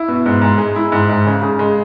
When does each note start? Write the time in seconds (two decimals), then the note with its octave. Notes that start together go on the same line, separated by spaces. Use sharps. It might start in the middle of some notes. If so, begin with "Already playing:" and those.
Already playing: E4
0.08 B2
0.26 G#2
0.42 G#2
0.58 G#3
0.76 E4
0.92 G#2
1.09 G#2
1.26 C#3
1.42 C#3
1.59 G#3